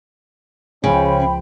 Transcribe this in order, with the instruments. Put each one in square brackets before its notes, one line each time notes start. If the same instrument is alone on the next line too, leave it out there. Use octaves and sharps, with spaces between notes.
[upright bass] C#2 F3 [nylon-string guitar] C#3 [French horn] C#4 [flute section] C5 G5 B5